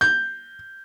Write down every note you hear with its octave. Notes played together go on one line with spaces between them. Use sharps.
G6